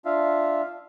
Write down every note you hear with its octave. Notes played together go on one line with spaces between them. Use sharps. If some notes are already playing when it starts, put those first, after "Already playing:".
D4 F4 E5 F5